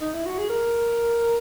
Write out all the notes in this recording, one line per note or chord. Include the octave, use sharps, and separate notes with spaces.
D#4
E4
F#4
G#4
A#4